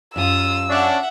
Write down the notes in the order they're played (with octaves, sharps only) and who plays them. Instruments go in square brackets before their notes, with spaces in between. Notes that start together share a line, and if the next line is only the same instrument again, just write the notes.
[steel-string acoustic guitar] F#2 G4 F5 [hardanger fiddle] F4 D#6 [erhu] E6
[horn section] C#4 D4 [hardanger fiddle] E5 F#5